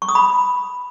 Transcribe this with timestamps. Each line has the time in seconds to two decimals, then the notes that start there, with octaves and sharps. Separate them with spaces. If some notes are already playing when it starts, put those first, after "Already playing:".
0.02 C#6
0.09 D#6
0.15 B5